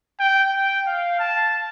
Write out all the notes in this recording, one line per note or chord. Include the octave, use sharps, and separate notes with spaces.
G5
G5
F5
A5